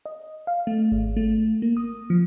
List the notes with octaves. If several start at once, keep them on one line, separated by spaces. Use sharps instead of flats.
D#5
F5
A3
G#1
A3
A#3
D#6
F3